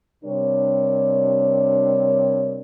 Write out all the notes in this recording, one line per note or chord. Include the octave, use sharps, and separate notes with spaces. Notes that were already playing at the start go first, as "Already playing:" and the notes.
C3 G3 D4 A#4 C#5